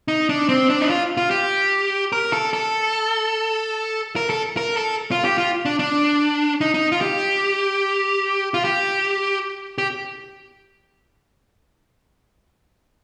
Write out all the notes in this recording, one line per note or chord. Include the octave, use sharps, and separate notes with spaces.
D#4
D4
C4
D4
D#4
F4
F4
G4
A#4
A4
A4
A#4
A4
A#4
A4
F4
G4
F4
D4
D4
D#4
D#4
F4
G4
F4
G4
G4